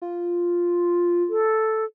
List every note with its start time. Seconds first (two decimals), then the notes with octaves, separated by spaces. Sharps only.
0.02 F4
1.29 A4